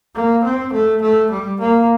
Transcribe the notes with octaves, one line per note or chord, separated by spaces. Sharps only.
A#3
C4
A3
A3
G3
A#3